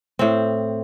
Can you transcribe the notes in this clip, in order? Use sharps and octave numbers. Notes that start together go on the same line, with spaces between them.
A2 C4